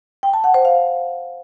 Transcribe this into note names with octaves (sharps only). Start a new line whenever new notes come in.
G5
A5
F#5
C5
F5